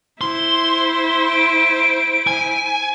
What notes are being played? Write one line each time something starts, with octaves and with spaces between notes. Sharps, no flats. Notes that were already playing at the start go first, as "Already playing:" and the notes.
E4 C5 C6
D7
G#5